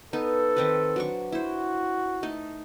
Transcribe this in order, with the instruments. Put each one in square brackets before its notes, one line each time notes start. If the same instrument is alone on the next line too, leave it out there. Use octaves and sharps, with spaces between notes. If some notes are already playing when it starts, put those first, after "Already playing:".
[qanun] B3 D#4 [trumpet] A4
[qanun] D#3 C4 B4
F#3 D4 C#6
[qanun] E4 C5 [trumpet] F#4
[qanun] A3 D#4